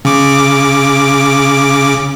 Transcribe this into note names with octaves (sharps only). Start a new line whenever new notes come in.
C#3 D6